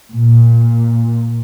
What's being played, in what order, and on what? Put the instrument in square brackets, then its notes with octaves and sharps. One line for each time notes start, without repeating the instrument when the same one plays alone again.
[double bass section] A#2